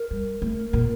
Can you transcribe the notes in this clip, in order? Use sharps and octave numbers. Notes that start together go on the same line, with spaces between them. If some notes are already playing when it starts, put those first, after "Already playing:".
Already playing: A#4
G3
A3
A#2